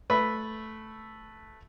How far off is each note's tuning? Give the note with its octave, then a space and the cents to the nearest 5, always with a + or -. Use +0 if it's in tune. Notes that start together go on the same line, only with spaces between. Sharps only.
A3 -5 B4 +0 E5 +0